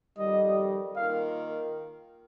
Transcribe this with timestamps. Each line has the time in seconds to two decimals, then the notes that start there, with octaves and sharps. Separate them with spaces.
0.18 F2 D#3 G3 D#5
0.96 D#3 A#3 F4 A#4 F5